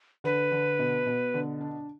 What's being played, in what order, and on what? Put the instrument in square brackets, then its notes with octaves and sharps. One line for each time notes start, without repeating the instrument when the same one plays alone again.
[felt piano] D3 [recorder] B4
[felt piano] D3
B2
B2
D3
D4